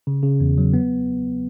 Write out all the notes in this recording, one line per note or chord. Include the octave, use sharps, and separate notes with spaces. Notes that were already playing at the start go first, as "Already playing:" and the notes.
C#3
C#3
E2
F#3
B3